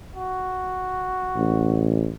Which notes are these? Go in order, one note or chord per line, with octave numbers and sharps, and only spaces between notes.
F#4
A1